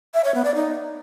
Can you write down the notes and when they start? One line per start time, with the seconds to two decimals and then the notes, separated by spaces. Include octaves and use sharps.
0.14 E5
0.24 C#5
0.34 B3
0.45 D5
0.55 D#4